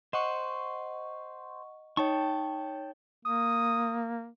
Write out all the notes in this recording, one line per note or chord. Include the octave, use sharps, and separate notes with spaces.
C5 D#5 F#5 C#6
D#4 C#5 G5 A5 C#6
A#3 D#6